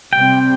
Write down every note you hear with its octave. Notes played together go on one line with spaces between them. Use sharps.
C3 G3 C4 G5